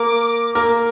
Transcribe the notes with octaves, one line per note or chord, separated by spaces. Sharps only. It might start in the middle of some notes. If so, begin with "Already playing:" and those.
Already playing: A#3 A#4 D6
A#3 A#4